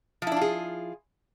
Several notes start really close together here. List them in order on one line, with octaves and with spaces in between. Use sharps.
F3 E4 D4 F4 G#4